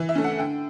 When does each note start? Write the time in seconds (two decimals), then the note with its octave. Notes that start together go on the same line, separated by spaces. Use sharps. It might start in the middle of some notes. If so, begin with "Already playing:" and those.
Already playing: E3
0.09 E5
0.15 A3 C#4
0.24 F#5
0.38 D3 G5